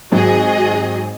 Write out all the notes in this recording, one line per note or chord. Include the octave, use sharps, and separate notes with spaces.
G#1 F#3 F#4 G#4 D#5